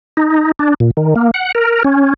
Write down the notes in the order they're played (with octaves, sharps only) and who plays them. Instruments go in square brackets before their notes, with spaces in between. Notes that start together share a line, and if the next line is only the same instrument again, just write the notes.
[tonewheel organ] D#4
D4
A#2
D#3
A#3
F#5
A#4
C#4